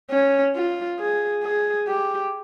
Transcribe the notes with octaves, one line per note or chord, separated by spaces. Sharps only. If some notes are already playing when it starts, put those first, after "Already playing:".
C#4
F4
G#4
G#4
G4